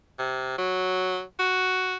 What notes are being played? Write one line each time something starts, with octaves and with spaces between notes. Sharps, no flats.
C3
F#3
F#4